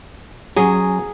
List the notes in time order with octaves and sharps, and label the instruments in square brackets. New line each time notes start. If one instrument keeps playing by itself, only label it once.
[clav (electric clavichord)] F#3 C#4 [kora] G#4